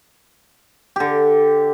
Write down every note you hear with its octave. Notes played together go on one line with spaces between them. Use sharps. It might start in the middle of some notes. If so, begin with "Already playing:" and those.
D3 G4